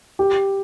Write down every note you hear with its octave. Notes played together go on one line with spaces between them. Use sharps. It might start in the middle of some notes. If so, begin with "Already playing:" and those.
G4